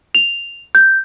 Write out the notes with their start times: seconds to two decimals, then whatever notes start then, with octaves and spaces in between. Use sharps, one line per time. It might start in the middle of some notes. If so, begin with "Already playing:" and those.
0.15 F7
0.75 G6